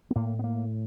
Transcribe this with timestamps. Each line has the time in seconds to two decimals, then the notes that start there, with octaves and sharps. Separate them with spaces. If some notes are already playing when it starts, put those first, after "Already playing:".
0.11 B3
0.15 A2 A#3
0.39 B3
0.44 A#3